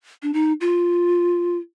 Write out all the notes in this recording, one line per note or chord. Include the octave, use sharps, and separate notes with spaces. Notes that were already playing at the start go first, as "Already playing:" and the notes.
D4
D#4
F4